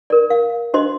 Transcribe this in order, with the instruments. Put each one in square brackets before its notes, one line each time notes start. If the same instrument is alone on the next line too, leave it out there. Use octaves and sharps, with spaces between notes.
[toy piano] A#4 D5
F5
D4 F#4 C5 D#5 C6